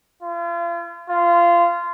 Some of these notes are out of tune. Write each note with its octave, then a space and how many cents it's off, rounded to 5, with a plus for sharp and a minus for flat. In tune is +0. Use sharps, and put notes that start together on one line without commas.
F4 -40
F4 -20